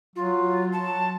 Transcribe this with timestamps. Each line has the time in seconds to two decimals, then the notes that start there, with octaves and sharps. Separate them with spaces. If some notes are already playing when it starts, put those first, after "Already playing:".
0.16 F#3 F4
0.72 F#3 A5